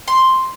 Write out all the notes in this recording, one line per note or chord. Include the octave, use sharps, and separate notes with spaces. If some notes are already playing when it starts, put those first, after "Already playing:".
C6